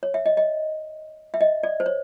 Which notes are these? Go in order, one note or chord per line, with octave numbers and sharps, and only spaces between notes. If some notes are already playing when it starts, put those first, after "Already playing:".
C#5
E5
D#5
D#5
E5
D#5
D5
C5
C#5